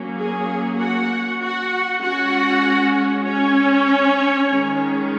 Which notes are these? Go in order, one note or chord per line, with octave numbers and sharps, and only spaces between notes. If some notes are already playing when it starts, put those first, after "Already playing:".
Already playing: F#3 A#3 C#4
G#4
F#4 F#5
F#4 F#5
G#3 C#4 F#4 F#5
C#4 C#5
D#3 G#3 C#4